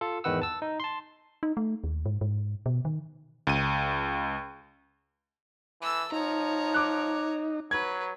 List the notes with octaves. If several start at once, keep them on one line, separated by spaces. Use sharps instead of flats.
F4 A4
E2 G#2 D#3 B4 F#5 E6
A5 E6
D#4
A5 C6
D#4
A3
D#2
G#2
G#2
B2
D#3
C#2 D#7
E3 A4 E6
F3 D#4 C#5 A#5
D6 F#6
F#3 B4 G#6